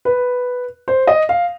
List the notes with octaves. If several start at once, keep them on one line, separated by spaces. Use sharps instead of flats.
B4
C5
D#5
F5